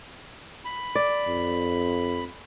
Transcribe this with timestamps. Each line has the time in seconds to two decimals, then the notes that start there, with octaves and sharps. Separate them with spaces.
0.65 B5
0.95 D5
1.28 F2